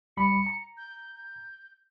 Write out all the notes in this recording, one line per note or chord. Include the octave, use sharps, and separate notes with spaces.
C#2 G3 B5 C#7
A#5
G6
G6